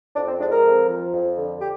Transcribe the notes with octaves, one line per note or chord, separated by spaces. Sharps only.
F2 D4
C4
G#3 D4
A#4
F2
F3
F2
D3
G4